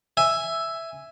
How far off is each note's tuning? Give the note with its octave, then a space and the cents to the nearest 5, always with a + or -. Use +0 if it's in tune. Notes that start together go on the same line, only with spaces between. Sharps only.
E5 +0 G#5 +0